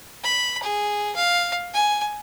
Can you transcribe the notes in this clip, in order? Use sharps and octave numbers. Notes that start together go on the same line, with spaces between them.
B5
G#4
F5
G#5